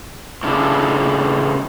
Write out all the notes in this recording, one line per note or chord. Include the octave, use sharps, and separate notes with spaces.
A2 C#3 D4